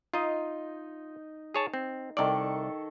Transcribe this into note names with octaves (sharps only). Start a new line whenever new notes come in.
D#4 F4 D#5
G#4 C#5 A5
C4
C2 D#3 A4 D5 C#6